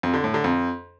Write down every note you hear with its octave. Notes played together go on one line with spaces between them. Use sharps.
F2
D3
A2
D3
F2